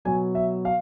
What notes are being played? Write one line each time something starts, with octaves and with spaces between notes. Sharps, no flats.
B2 F#3 B3 G#5
E5
F5